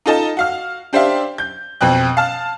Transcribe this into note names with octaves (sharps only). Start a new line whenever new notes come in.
D#4 F4 A4 D#5 A5
F#4 F5 F6
D4 G4 C5 D5 E5 F5
G6
F2 B2 C4 G5 F#6
F5 A5 F6